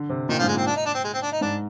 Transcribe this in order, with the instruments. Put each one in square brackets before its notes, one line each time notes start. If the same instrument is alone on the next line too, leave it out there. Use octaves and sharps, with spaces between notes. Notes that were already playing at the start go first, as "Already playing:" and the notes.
Already playing: [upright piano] D3
C3
[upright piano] A#2 [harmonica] D#3
[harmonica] F3
[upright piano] G#2
[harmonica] G#3
[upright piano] A#2 [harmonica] C4
[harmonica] D4
D#4
D4
C4
G#3
C4
D4
D#4
[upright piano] G#2 [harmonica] D4